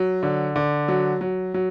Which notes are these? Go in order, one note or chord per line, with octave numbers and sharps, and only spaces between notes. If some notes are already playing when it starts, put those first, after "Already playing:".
Already playing: F#3
D3
D3
F#3
F#3
F#3